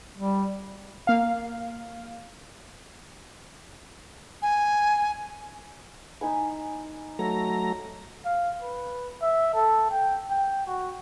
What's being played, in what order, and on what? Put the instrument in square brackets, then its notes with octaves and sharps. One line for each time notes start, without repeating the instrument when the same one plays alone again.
[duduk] G3
[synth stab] A#3 F5
[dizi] G#5
[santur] D#4 G#5 B5
[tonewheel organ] F#3 A3 A#5 [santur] C#5
[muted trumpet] F5
B4
E5
A4
G5
G5
F#4